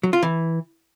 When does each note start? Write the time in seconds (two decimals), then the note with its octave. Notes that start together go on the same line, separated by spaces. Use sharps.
0.03 F#3
0.13 F4
0.23 E3